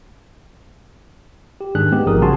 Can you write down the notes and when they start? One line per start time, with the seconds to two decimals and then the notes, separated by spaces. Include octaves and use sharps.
1.61 G4
1.75 G#2 D#3 D4 G#4 F#6
1.92 G#3 A3 B3 C4 G4 G#4
2.07 A1 G#2 F3 A#4 D#6
2.21 C#3 G3 F#4 G#5 A5 C6